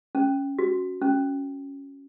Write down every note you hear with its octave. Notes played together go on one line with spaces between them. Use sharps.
C#4
F#4
C#4